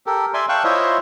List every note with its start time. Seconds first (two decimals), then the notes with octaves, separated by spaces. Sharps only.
0.06 G4 A4 A#4
0.34 D5 E5 G#5 C6
0.49 D5 F5 G5 A5 C#6 F#6
0.64 E4 F4 C5 C#5 D#5 E5